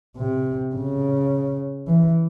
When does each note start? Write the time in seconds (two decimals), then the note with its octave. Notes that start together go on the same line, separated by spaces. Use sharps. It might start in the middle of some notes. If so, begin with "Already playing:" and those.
0.17 C3
0.75 C#3
1.88 E3